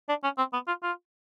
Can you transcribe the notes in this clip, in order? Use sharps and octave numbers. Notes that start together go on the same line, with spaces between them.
D4
C#4
C4
B3
F4
F4